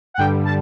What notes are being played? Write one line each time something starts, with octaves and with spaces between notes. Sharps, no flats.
F#5
G2 D3 G3 G5
A5